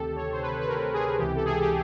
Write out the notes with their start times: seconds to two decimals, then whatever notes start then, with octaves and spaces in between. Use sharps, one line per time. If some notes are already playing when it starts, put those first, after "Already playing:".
Already playing: D2 C3 D#3 G4 A4
0.16 C#5
0.32 C5
0.42 B4
0.61 B4
0.68 A#4
0.94 G#4
1.19 C#2 C3 E3 G4
1.36 A4
1.45 G#4
1.61 G4